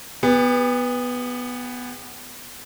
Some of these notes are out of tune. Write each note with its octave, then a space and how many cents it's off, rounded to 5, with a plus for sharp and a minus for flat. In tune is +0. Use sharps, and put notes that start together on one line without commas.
B3 +0 G4 +45